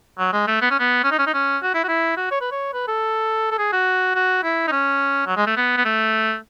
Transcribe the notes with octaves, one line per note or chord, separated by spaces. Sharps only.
F#3
G#3
A3
B3
C#4
B3
C#4
D#4
C#4
D#4
C#4
F#4
E4
F#4
E4
F#4
C#5
B4
C#5
B4
A4
A4
G#4
F#4
F#4
E4
D#4
C#4
F#3
G#3
A3
B3
B3
A3